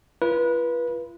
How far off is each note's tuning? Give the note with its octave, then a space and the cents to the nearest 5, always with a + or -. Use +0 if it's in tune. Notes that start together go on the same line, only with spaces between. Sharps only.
F4 -40 B4 -25